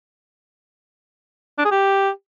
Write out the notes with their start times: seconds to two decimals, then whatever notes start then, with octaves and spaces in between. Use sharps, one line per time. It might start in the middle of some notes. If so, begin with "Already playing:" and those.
1.58 D4
1.65 G#4
1.71 G4